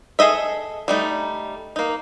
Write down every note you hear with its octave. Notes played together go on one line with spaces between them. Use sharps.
G#4 A4 D#5 E5
G3 A3 D#4
A#3 D#4